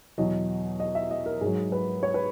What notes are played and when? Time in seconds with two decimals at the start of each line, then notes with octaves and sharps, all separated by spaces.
0.18 E2 B2 F#3 D#5
0.80 D#5
0.95 E5
1.11 D#5
1.26 A#4
1.41 G#2 F#3 G#4
1.72 B4
2.03 C#5
2.14 B4